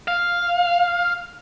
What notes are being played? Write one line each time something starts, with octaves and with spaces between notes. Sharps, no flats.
F5